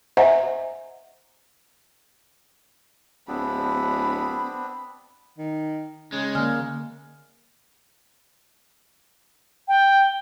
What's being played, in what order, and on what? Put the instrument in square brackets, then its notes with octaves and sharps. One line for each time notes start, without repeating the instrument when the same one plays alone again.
[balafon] C5 D#5 E5 F#5 G#5 A#5
[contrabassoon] D1 [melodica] B3 C4 D4 [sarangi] B5
[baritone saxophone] D#3
[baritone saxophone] C#3 [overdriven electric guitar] G#3
[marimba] D3 G#5 F6 [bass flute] A#3
[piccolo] G5